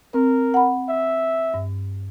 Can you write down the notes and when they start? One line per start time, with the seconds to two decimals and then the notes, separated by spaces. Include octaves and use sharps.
0.14 C4 A#4
0.54 F#5 B5
0.89 E5
1.54 G2